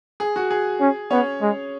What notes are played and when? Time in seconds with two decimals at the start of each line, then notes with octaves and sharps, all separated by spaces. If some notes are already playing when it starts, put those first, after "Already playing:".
0.20 G#4
0.36 F#4
0.51 G#4
0.80 C#4
1.10 B3 C#4 C#5
1.41 G#3